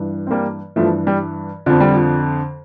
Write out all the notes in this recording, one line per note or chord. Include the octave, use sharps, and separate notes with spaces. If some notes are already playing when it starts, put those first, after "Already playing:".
Already playing: G2 E3
C4
G3 A#3
G2 E3 F3 A3
G3
F2 D3 F3
G3
F3